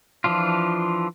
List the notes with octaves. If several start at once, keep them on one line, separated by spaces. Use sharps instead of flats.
E3 F3 D4 F4